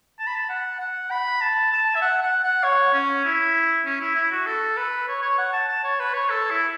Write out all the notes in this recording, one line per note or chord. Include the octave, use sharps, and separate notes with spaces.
A5
B5
A5
F#5
F#5
B5
A5
A5
E5
F#5
F#5
F#5
C#5
C#4
E4
C#4
E4
E4
F#4
A4
B4
C#5
C#5
F#5
A5
A5
C#5
B4
C#5
A4
E4